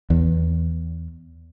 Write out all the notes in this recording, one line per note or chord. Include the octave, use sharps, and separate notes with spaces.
E2